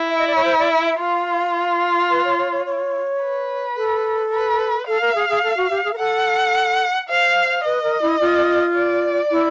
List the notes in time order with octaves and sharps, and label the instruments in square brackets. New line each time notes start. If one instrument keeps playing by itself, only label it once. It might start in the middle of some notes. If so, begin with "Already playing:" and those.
Already playing: [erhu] E4
[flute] E5
D#5
D5
C#5
C5
D5
E5
E5
[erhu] F4 [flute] F5
[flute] B4
C#5
C#5
C#5
C#5
[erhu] B4
[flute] A4
[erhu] B4
[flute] A4 [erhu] F5
[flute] A#4
G#4
G#4
A4
F#4
G4
G#4
A#4
[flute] A4 [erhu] F#5
[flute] C5 [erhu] F5
[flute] B4 [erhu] D#5
[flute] A#4
E4
F4
[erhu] D5
[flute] E4